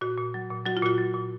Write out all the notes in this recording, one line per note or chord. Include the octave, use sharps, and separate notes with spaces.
A#2 F#4
A#2
F#3
A#2
F#3 F#4
F4
A#2 F#4
F#3
A#2